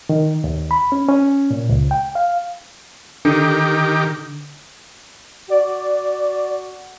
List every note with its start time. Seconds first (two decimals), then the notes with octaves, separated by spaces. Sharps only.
0.09 D#3
0.44 D#2
0.71 B5
0.92 C#4
1.08 C#4
1.51 A#2
1.69 C#2
1.91 G5
2.15 F5
3.25 D3 D#3 G4
5.50 F#4 D5